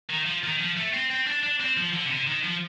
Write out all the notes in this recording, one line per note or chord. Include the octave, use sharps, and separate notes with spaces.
D#3
F3
D#3
F3
A3
C4
C4
D4
D4
C4
F3
D3
C3
D3
D#3
F3